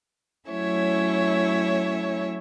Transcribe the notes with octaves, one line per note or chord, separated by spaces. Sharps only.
F#3 A3 C#4 E4 C#5 E5